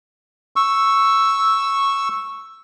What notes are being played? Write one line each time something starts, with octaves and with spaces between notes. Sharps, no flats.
C#6 E6